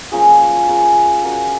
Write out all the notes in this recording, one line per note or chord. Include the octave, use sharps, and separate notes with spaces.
F3 A#3 C#4 G#4
F3 A#3 C#4 G#4
C#4 F#4 A#4